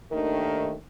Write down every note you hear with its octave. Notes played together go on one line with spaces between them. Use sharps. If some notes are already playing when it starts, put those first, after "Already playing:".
D#2 D#3 A3 D4 A#4